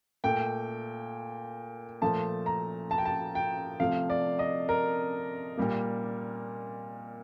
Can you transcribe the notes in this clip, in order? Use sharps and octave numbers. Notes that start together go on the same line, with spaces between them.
A#2 A3 G5
A#2 F3 A3 A5
A#5
A5
G5
A5
G5
C3 F3 A3 F5
D5
D#5
A#4
A#2 G3 A#3